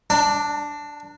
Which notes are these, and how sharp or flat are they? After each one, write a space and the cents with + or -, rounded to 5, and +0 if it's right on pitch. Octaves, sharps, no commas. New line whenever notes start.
D4 +0 A5 +45